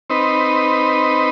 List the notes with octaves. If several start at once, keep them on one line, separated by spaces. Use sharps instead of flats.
C4 D#4 B4